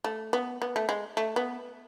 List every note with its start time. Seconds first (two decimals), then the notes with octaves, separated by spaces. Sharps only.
0.04 A3
0.33 B3
0.62 B3
0.76 A3
0.89 G#3
1.17 A3
1.36 B3